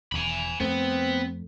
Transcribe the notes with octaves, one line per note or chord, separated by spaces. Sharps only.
E1 E2 G#5 B5
F2 A3 B3 C4